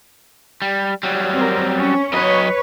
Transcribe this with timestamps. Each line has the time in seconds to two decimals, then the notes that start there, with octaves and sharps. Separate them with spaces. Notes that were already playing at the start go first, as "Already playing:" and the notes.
0.62 G3
1.03 F#3 G3
1.34 C4 A#4
1.77 C#4
2.13 F#3 B4 C#5 D#5